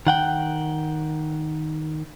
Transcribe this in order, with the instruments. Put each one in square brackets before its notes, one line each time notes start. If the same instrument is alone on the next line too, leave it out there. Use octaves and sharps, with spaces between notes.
[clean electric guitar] D#3 F#5 G5